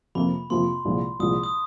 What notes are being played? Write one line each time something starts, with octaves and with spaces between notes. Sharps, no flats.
F2 C3 F3 A#3 B5
F2 C3 F3 A#3 C6
C2 A#2 F3 G#3
C2 A#2 F3 G#3 D#6
D#6